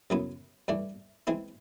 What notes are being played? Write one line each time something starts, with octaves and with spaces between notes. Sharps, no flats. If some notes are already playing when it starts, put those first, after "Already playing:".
F#2 C#3 F#3 B3 E4
G2 E3 A3 D4
E3 G#3 C4 E4